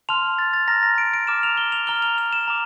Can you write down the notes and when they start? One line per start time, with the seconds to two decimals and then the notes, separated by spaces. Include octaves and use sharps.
0.09 A5 C6 F6 F7
0.39 A6
0.53 A6
0.68 A#5 F6 A#6
0.83 A#6
0.98 D7
1.14 D7
1.27 A#5 D6 F6 E7
1.43 F7
1.57 G7
1.72 F7
1.87 A#5 F6 G7
2.02 F7
2.18 F7
2.33 E7
2.48 A#5 D6